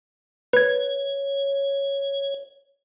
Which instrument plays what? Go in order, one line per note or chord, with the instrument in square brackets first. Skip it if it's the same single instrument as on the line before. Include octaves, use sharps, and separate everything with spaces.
[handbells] B4 G#6 [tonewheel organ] C#5